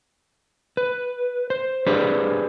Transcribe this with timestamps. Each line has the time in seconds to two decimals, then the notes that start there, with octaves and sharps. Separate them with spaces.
0.77 B4
1.50 C5
1.86 D4 G4 G#4 B4 C5 D5